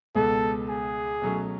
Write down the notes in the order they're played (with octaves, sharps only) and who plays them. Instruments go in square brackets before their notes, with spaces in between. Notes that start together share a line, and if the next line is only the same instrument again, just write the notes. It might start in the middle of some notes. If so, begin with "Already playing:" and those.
[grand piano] C#2 B2 G#3 B3 [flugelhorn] A4
[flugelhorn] G#4
[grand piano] B2 F#3 A3 C#4